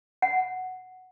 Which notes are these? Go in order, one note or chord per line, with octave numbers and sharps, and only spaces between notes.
F#5